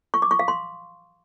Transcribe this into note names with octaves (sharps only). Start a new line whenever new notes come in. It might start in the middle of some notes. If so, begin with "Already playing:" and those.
C#6
D6
C#6
F5
C6